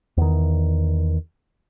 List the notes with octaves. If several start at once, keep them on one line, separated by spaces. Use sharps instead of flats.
E2 D#3